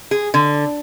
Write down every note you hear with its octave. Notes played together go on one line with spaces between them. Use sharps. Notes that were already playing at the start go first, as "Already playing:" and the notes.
G#4
D3